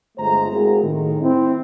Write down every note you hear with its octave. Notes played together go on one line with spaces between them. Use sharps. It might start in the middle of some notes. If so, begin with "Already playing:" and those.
G1 G#3 A3 F4 C5 A#5
G#3 A#3 C4 E4 F#4 G#4
A2 D#3
C4 E4